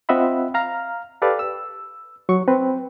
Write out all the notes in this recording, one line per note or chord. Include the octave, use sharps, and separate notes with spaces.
C4 F4 D#5 E5 F#5 B5
F5 A#5 F6
G4 A4 B4 D5 F5
E6
F#3 C#6
C4 B4